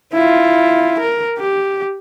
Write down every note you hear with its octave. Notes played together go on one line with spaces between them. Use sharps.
E4 F4
A#4
G4